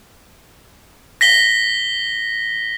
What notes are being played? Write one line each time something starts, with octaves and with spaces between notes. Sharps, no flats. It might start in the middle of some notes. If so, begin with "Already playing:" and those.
A#6 B6 G7